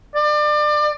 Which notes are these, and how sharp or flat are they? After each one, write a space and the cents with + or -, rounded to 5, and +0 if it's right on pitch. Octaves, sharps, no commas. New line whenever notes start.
D5 +30